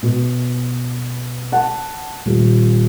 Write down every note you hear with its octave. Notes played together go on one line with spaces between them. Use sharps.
B2
F#5 A5
D#1